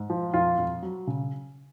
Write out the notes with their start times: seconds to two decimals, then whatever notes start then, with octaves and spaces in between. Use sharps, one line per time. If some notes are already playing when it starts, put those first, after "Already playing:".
Already playing: G#2
0.10 F3
0.34 F2 F4
0.58 F2
0.83 F#3
1.07 C#3